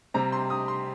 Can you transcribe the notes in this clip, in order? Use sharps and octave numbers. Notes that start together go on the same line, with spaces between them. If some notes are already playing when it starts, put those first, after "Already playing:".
C3 G3 C4 A#5
C6
D#6
C6